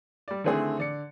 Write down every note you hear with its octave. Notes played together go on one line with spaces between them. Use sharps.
G3 D5
D3 D#3 A3 C4 E4 G#4
D3 D5 C#7